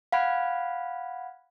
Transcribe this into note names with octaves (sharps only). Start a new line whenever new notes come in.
F5 F#5 B5 G#6 D7